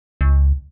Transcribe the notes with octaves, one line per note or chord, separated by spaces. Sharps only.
C#2